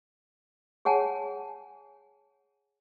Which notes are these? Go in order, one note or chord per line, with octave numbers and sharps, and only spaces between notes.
G#4 C#5 F#5 G#5 A5